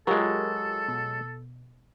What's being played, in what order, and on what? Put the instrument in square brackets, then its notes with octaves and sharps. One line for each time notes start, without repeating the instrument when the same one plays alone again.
[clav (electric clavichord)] F#3 G#3 [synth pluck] F4 G4 A#4 [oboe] A4
[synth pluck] B2